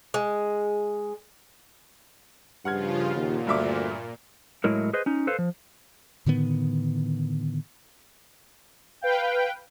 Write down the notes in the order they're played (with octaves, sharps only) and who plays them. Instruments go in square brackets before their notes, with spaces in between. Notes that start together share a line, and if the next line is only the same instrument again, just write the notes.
[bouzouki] G#3
[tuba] G2 [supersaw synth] C#3 F3 F4 [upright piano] F#5 F6 G#6
[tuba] D#2 [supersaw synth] A#2
[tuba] D2 [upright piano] G2 E5 D6
[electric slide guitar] A2 F#3 G#3 E4 A#4
G#4 B4 C5 D#5
C#4 D#4
A4 B4 C5 F5
F3
[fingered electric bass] A2 D3 D#3 B3
[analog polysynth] B4 F5 G5